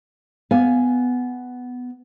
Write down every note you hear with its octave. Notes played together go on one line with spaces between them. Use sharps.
B3 F5 G#5